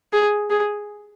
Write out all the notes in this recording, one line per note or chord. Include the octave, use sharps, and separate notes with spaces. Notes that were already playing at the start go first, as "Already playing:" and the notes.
G#4
G#4